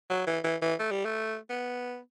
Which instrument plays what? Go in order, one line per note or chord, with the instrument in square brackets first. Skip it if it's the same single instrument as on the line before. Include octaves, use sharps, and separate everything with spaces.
[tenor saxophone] F#3
E3
E3
E3
A3
G3
A3
B3